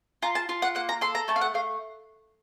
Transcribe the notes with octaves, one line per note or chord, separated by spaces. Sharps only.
F4 A#5
A5
F4
F#5
A#3 F#5
A#5
A4 C6
A#5
A3 A5
F5
F#5
A3 F5